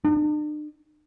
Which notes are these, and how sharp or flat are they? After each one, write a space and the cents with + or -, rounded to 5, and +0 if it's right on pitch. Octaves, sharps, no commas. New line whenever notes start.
D4 +45